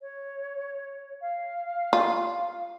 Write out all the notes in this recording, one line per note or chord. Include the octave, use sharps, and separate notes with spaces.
C#5
F5
F4